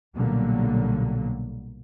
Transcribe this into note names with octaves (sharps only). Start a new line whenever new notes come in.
B1 A#2 D3 F#3 G3 A#3